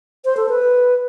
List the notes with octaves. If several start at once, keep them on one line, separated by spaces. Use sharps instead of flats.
C5
A4
B4